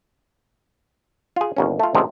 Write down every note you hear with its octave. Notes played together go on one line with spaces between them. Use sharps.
F4 G#4
G1 D#2 C#4
A3 F4
A1 D2 C3 F3 G#3